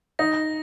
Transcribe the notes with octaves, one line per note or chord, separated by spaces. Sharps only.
D#4 A#6